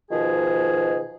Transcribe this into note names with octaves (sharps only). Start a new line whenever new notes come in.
B2 D#3 F3 G#4